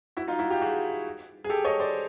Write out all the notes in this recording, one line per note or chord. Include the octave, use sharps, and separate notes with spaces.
E4 F#4
D#4 F4
E4 F#4
F4 G4
F#4 G#4
G#4
G4 A4
C#5 D#5
C5 D5